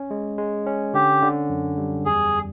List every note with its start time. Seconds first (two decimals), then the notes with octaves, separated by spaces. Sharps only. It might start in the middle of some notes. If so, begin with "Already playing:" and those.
Already playing: C#4
0.11 G#3
0.38 G#3
0.67 C#4
0.94 D3 G4
1.22 D3
1.50 F#2
1.78 G3
2.05 E2 G#4